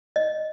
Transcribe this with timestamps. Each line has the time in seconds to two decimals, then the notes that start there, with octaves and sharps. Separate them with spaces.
0.16 D#5